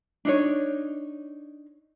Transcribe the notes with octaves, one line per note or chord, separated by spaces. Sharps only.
D4 D#4 C#5